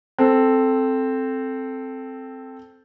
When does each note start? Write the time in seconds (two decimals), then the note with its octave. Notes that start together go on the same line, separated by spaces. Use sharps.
0.18 C4 A4